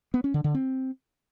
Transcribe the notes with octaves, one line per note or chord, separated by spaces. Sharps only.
B3
C#4
D3
D3
C4